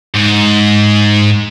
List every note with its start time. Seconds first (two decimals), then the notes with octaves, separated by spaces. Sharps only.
0.15 G#2